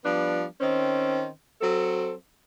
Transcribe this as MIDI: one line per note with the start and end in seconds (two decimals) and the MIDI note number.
0.04 0.44 53
0.04 0.44 55
0.04 0.44 59
0.04 0.44 62
0.61 1.28 51
0.61 1.28 60
0.61 1.28 61
0.61 1.28 72
1.61 2.12 54
1.61 2.12 60
1.61 2.12 69